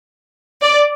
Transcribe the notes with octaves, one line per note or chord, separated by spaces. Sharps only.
D5